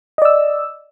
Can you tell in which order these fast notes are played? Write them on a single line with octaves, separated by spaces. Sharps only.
D#5 D5 E6